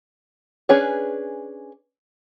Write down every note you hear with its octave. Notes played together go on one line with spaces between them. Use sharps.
C#4 D4 G#4 B4 C#5